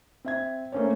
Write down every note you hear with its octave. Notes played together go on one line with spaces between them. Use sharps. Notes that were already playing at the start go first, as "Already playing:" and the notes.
C4 E5 G#6
A3 A#3 C#4 C5 C#5